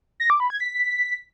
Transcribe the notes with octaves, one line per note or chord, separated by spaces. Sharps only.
A#6
D6
B5
G#6
B6